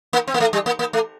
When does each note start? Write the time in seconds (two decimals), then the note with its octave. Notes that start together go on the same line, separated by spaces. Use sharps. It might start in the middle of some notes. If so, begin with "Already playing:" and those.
0.13 A#3
0.28 C4
0.34 A#3
0.40 A3
0.53 G3
0.66 A#3
0.79 A#3
0.93 A3